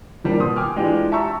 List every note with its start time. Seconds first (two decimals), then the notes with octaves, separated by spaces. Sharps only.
0.24 F3 G3 A#3 D4
0.40 B2 C6 D#6
0.56 G5 G#5 D6 F6
0.76 E3 G#3 D4 F4 G4
1.12 E5 A5 A#5 C#6 E6